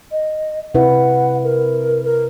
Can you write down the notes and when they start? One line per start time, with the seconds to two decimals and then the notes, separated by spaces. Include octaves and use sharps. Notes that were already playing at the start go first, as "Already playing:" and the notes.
0.11 D#5
0.75 C3 E4 B4 F#5
1.44 A#4
2.04 A#4